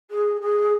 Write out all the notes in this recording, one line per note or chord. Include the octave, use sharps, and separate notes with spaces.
G#4
G#4